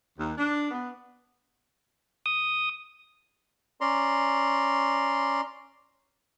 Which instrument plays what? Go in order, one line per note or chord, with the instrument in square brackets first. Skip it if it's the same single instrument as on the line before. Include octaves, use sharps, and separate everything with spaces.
[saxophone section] D#2
D4
B3
[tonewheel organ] D#6
[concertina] C#4 D5 A#5 C6